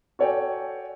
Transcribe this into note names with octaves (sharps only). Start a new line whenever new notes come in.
F#4 A4 C#5 D5 G5 G#5